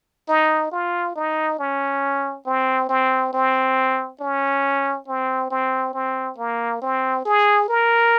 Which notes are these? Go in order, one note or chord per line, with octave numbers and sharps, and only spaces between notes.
D#4
F4
D#4
C#4
C4
C4
C4
C#4
C4
C4
C4
A#3
C4
G#4
A#4